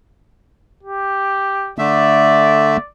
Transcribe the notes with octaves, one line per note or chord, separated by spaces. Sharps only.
G4
D3 A3 D5 E5